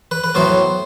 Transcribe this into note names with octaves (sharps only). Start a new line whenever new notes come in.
B4
B4
A2 F#3 B3 C5